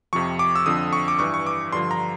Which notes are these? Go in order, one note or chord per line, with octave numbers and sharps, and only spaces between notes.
F2 C3 F3 C#6
D6
E6
F2 D3 F3 D#6
C#6
D6
G2 E3 C#6
C#6
D6
G2 D3 F3 C6
A#5